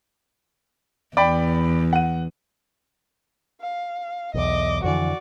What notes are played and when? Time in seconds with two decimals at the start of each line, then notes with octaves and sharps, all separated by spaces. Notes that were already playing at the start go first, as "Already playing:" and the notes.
1.17 E2 D5 G5 B5
1.93 F#5 D#7
3.61 F5
4.34 B1 E2 D#5 D6
4.84 F2 D3 E3 F#4 D5